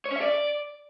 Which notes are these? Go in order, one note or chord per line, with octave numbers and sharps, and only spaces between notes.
C#5
C#4
E5
D5